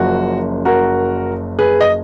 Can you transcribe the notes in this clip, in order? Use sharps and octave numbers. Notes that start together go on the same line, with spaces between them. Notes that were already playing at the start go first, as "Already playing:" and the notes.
Already playing: F#1 F#2 F3 F#4
F#4 A#4
G#4 B4
D#5